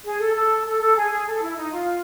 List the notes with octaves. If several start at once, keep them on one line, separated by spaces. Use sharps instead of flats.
G#4
A4
A4
A4
A4
G#4
G#4
A4
E4
D#4
F4